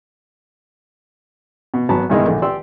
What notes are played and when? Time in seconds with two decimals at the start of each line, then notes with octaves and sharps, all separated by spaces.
1.74 B2
1.89 G#1 F#3 B3 A5 B5
2.10 G2 B2 D#3 G#3 D#4 E4
2.26 A#1 D3
2.42 G4 D5 C6 E6